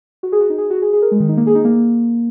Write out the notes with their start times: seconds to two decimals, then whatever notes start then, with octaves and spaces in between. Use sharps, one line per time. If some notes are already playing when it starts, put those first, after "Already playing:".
0.23 F#4
0.32 G#4
0.41 F#4
0.50 D#4
0.58 G#4
0.70 F#4
0.82 G#4
0.93 G#4
1.02 A#4
1.11 G#3
1.20 D#3
1.29 D#4
1.37 A#3
1.47 G#4
1.55 D#4
1.65 A#3